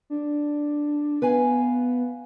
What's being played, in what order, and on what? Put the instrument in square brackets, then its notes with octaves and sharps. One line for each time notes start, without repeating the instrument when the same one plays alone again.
[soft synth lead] D4
[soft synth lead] B3 [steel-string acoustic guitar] B4 F5 G#5